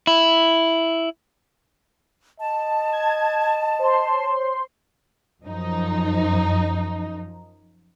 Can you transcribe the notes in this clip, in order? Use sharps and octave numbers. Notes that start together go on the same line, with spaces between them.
E4
D#5 A5
G#6
C5 C6
C#5
F#2 F3 D#4